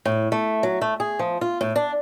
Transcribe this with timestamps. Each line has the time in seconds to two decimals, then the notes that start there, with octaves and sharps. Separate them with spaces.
0.05 A2
0.32 A3
0.63 F#3
0.81 A3
1.00 G#4
1.19 F3
1.41 F4
1.61 A2
1.76 D4